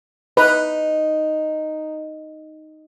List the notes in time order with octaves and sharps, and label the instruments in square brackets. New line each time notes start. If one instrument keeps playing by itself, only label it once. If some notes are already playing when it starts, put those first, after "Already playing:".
[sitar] D#4 [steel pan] B4